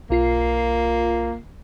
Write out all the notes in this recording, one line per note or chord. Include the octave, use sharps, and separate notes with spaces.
B1 A#3 F4 C7